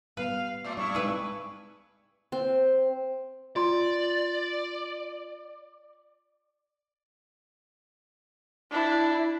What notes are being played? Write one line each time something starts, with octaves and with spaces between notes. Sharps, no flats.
G3 B3 B4 F5
A2 D5
G2 G3 E4 D5 C#6
G#3 C4 D#4 G#4 B4
C4
F4 D5 C6
D4 E4